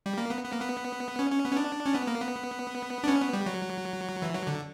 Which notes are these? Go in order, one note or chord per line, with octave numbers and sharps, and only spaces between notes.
G3
A#3
B3
B3
A#3
B3
C#4
C#4
B3
C#4
D4
C#4
B3
A#3
B3
D4
C#4
B3
G3
F#3
E3
F#3
D3